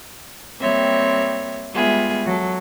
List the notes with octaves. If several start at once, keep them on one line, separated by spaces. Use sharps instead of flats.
G3 A#3 C4 C#5 E5
G3 G#3 B3 F4 G#4 E5
F#3 A4